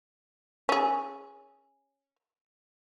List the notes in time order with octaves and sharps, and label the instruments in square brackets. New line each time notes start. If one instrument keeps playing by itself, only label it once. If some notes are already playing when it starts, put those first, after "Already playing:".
[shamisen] C#4 G#4